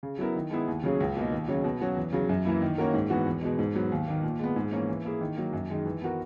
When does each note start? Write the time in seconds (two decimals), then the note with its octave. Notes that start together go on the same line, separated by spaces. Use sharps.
0.03 C#3
0.18 F#3 B3 E4 A#4
0.36 D#3
0.51 G#3 B3 E4 G#4
0.68 D#2
0.83 C#3 F#3 C#4 G#4
1.00 C#2
1.16 B2 A#3 D#4
1.32 D#2
1.48 C#3 F#3 C#4
1.64 B2
1.81 F#3 C#4 F#4
1.97 E2
2.13 C#3 F#3
2.29 F#2
2.45 E3 A#3 E4
2.62 D#3
2.78 A#3 C#4 F#4 A#4
2.94 G#2
3.10 E3 B3 F#4
3.26 E2
3.42 B2 G#3
3.59 G#2
3.75 F#3 B3
3.92 D#2
4.07 D#3 A#3
4.23 A#2
4.39 G#3 B3
4.56 G#2
4.72 E3 A#3 C#4
4.89 E3
5.05 A#3 E4 G#4
5.21 D#3
5.37 F#3 A#3
5.53 F#2
5.70 D#3 G#3 D#4
5.85 E3
6.02 B3 F#4 A#4